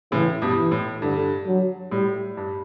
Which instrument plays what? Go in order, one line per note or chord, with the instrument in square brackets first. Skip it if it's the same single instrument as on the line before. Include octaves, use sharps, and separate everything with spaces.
[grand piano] A2 C#3 [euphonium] E3
[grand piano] G2 B2
[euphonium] E3
[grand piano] A2
[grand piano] G2 [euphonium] D3
[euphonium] F#3
[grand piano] A2 [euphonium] G3
[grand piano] G2